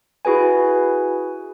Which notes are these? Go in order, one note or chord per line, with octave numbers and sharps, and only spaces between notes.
E4 F#4 G#4 B4 G#5